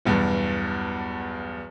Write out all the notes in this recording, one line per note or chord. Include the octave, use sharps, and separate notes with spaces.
B1 E2 G2